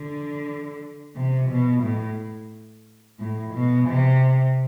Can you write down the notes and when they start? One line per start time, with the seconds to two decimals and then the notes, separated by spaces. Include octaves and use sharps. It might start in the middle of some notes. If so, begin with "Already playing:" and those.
Already playing: D3
1.16 C3
1.50 B2
1.83 A2
3.20 A2
3.54 B2
3.88 C3